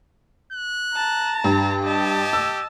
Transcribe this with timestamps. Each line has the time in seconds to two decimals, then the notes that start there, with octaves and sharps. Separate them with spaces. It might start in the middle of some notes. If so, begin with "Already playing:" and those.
0.53 F#6
0.94 A5 A#5
1.44 G2
1.84 G4 D#5 A5
2.33 E6